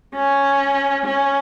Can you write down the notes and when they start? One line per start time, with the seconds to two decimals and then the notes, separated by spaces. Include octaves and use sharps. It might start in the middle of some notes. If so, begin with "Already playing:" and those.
0.15 C#4
1.05 C#4